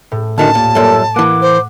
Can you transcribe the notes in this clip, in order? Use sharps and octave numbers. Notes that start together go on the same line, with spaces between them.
A2
D2 D3 D#3 C#4 F#4 A5
D#2 A#2
F#2 A#2 G3 A4
E3 A#3 F#5 D6
C5